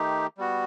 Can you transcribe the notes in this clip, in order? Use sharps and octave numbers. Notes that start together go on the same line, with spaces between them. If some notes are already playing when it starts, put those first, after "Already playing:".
Already playing: D#3 A3 D#4 G4
G3 B3 F#4